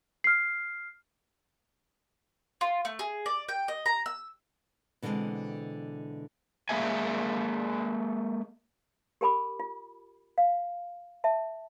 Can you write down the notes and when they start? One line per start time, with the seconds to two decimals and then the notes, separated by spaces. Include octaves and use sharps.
0.24 F6 C7
2.61 F4
2.85 A3
2.99 G#4
3.26 D5
3.49 G5
3.68 D#5
3.86 A#5
4.06 E6
5.02 B2 D3 E3 G3 G#3 C4
6.69 G#3 A#3 G#4 E5 G#5
9.21 G4 A#4 G#5 B5 D6
9.60 F4
10.38 F5
11.24 E5 A5